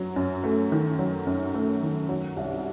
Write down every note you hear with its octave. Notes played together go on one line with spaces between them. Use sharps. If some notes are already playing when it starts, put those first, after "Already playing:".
Already playing: F#2 F#3
F#2
A3
D#3
F#3
F#2
A3
D#3
F#3
C2